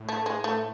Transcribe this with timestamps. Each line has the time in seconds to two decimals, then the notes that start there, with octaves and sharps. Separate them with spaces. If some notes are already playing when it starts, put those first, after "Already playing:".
Already playing: A2
0.09 A3
0.26 G#3
0.44 A3